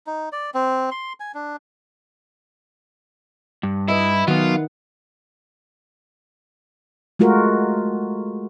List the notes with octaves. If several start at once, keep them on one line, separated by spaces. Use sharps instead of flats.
D#4
D5
C4
C6
G#5
D4
G2
E4 B4 D#5 E5
D#3 F#3 B3 F4 F#5
G#3 A3 F4 F#4 A#4